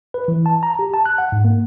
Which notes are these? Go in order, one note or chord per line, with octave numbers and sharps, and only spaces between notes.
B4
E3
A5
A#5
G4
A5
F#6
F#5
G#2
A#3